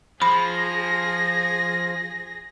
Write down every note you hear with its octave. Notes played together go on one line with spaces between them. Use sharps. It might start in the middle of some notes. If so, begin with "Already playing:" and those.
F3 G#4 B5 A#6